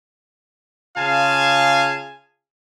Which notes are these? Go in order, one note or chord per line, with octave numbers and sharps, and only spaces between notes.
C#3 F4 G#4 F5 G#5 A5